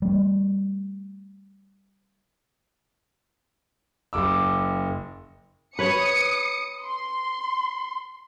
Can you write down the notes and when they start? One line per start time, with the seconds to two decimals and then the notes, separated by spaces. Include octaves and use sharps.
0.02 G3 A3
4.13 F#1 D6 E6
5.79 B4 C#5 D#6 C#7
6.84 C6